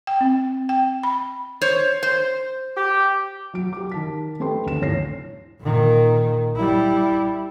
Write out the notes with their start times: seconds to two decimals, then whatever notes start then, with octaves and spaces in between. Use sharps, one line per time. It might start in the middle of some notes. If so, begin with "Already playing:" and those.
0.07 G5
0.21 C4
0.69 G5
1.03 B5
1.61 C5 C#5
2.03 C5
2.77 G4
3.53 F#3 D7
3.73 G4 D6
3.92 D#3 A5 B6
4.40 A3 G4 A4 B4 G5 C6
4.66 D2 D#3 E7
4.81 G1 A2 C#5 A#6 C7
5.61 A#2 D#3
6.56 G3 E4